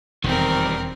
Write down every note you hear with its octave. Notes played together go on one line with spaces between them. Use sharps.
E1 F2 D#3 G3 C4 A#4